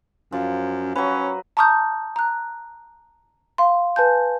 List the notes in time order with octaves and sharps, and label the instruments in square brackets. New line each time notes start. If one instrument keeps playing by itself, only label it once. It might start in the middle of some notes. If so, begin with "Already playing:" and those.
[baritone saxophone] F#2 [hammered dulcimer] F3
[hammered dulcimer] F#3 B4 [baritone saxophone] C#4
[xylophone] A5 A#5 C#6 D#6 F6 G6
A#5 F#6
F5 C6
B4 G#5 A5 G6